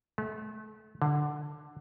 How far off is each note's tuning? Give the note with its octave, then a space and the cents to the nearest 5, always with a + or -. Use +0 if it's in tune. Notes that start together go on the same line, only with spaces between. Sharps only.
A3 -35
D3 +10